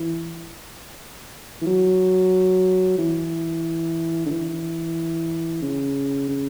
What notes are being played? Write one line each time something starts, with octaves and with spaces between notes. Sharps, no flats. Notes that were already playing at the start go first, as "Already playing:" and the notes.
Already playing: E3
E3
F#3
E3
D3
E3
C#3
C#3